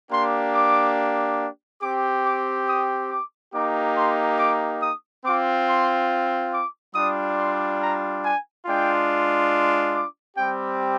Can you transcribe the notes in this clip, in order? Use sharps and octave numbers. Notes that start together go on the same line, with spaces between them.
A#3 D4 G4 C6
D6
C4 G4 D6
D6
D#6
D6
A#3 D#4 G4 D6
C6
D6
D#6
C4 F4 D6
C6
D6
G3 D4 F4 D#6
C6
A#5
G#5
G#3 D4 F4 G5
D6
G3 C4 G4 G5